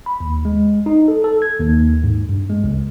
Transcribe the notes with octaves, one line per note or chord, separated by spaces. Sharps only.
B5
D#2
G#3
D#4
A4
A4
G#6
D#2
G#2
G2
G#3
C#2